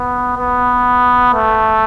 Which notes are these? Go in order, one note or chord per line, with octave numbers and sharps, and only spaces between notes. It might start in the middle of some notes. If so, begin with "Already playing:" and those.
Already playing: B3
B3
A3